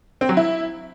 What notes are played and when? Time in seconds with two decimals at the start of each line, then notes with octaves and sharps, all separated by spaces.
0.21 C4
0.29 F#3
0.37 E4